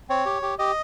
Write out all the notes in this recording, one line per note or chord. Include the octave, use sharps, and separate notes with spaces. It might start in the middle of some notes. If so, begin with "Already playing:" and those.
C4 C#5
G4
G4
G4 D#5